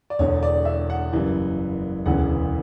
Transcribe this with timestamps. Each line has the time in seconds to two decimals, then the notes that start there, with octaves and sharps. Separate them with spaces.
0.10 D5
0.19 E1 E2 D3 C#5
0.43 D5
0.65 E5
0.90 F#5
1.12 F#1 F#2 E3 G3
2.06 E1 D2 C#3 E3 B3 F#5